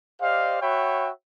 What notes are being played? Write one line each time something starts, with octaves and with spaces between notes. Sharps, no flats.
G4 C5 D5 D#5 F5
F#4 C#5 E5 F#5 G5 B5